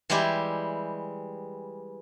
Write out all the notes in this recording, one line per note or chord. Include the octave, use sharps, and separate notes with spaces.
E3 G3 G#3 E4 G4